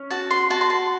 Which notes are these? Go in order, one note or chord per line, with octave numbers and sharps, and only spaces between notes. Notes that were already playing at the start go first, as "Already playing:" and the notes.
Already playing: C#4
F#4 A5
C6
F#4 A5
C6
A5